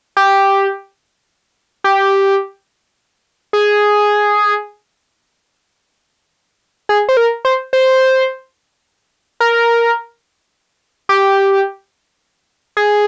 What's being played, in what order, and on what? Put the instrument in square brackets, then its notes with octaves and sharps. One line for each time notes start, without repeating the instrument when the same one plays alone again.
[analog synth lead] G4
G4
G#4
G#4
C5
A#4
C5
C5
A#4
G4
G#4